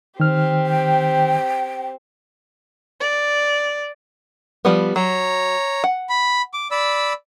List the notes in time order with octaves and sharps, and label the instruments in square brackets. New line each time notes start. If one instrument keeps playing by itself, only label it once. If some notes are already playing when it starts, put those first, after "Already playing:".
[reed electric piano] D#3 F6 [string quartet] C4 G4
[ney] G5
[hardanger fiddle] D5
[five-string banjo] F3 G3 B3
[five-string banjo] F#3 [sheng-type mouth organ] C#5 A#5
[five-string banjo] F#5
[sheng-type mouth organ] B5
D6
D5 B5 E6